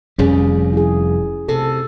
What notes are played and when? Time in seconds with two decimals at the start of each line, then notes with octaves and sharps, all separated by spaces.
0.19 F1 F2 G3 C#4 G#4
0.73 E4 G#4
1.48 C3 A4